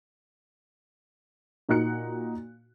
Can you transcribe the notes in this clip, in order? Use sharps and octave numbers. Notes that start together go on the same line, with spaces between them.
A#2 D#4 F#4 F#6 C#7